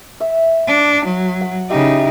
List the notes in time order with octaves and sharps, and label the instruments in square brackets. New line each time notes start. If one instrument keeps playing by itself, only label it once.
[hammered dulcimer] E5
[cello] D4
F#3
[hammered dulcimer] F#5
[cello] C#3 D#4 [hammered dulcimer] E4 G4 E5